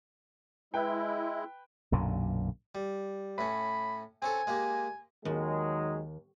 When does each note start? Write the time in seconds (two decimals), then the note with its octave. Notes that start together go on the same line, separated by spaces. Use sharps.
0.74 G#3 E4 B4 G5
1.92 B1 F#2 A#2 D3
2.75 G3
3.38 A2 C#4 B5
4.22 C4 C#4 A4 G#5
4.47 G#3 A#3 G4
5.25 D#2 D#3 F#3 G#3